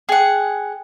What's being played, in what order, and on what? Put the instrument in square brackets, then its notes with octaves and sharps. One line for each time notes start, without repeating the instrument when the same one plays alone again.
[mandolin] G#4 F#5 [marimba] G5